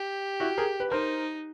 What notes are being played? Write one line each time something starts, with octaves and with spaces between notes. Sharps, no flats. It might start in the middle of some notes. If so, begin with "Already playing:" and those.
Already playing: G4
E4 F#4
G#4 A#4
B4
D#4 A#4 C5